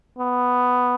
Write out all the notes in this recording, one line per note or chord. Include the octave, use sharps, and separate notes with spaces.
B3